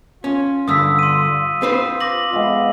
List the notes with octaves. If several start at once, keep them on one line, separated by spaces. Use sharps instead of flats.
C#4 F4
G2 D3 D#6 E6 B6
C6 D#7
C4 B4 C5
D6 A#6 F#7
G#3 B3 F5